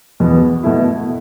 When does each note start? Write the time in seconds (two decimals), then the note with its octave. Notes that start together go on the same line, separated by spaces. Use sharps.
0.20 E2 B2 B3
0.63 B2 A3 E4